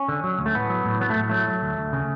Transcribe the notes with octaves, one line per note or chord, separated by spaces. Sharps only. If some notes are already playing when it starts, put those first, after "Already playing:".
Already playing: C#4
D3
F#3
D2
A3
A2 B3
F#3
A2
F#3 B3
A3
A2
F#3 A3
F#3
D2
D2
C#3